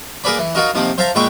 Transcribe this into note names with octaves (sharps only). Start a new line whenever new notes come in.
A#3 G#4 A#4 B4 D5 B5
E3
D#4 F4 F#4 A#4 D#5
C3 D#3 F3 A#3
C5 E5 F5 A5 A#5
A#2 G#3 B4 E5 G5 C#6